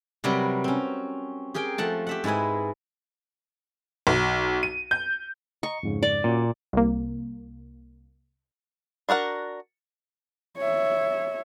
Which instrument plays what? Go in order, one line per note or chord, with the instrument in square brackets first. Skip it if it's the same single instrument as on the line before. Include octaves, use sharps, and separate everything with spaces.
[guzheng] C3 F#3 G3 F#4 A#4 B4
C4 C#4
G4 G#4 A#4 G5
F3 A3 F#5 A5
G4 E5 F#5
G#2 G#3 E4 B4 G#5
[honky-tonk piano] B1
D#7
G6
[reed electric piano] D#5 A#5 [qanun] C#6
[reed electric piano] F2 G#2 C#3
[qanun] D5
[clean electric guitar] A#2 [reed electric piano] C#4 F#4
[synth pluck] C2 A#3
[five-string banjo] D4 F#4 A#4 F#5
[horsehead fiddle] C#5 E5